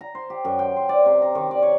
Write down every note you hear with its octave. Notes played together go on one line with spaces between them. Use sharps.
A#5
C5
G4
F#2
G5
C5
D5
C3
A#5
D#3
D5
C#5